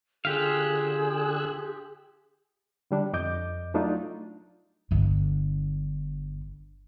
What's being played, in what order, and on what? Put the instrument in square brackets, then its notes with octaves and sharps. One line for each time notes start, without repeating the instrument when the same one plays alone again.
[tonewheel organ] D3 E6 F#6 [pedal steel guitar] F4 G4 F5 [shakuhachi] G#4
[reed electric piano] D3 G3 D4
F2 D#5 D6 G6
F#3 A3 D4 D#4 F4
[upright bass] G1 D3